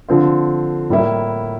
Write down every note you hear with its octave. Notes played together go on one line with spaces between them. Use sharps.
D3 F3 C4 F4
A2 G3 A#3 E4